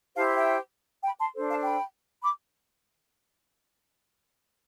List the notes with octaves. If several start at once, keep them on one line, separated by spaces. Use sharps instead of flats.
E4 G4 C5 F5 A5
E5 G5
G5 B5
A5 C6
D4 A4 C5
F5 A5
G5 B5
B5 D6